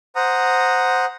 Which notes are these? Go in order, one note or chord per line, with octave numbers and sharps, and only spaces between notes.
C5 F#5 A#5 D#6